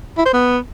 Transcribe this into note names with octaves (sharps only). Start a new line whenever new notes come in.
E4
C5
B3